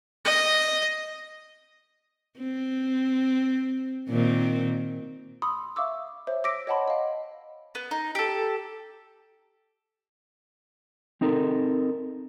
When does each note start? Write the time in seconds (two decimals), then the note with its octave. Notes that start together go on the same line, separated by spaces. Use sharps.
0.25 D#5
2.38 C4
4.09 A#2 D#3 C4
5.42 B5 C6 D#6 E6
5.76 E5 F5 C#6 D6 E6
6.27 C5 C#5 E5
6.44 D6 E6 A#6 B6 D7
6.67 C#5 D#5 F#5 A5 B5 C6
6.88 D#5 F5
7.75 B3
7.91 D#4
8.15 G4 A4
11.21 C4 D#4 A4 A#4